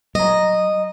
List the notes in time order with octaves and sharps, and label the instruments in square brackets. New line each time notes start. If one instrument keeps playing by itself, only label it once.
[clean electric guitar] F#3 A#5 [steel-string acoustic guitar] D#5